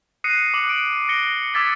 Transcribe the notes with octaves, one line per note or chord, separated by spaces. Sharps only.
D#6 F#6 A#6 C7 C#7 D#7
D6 F#7
D7
A#6 C#7 G7
D6 E6 G#6 A6 B6 C#7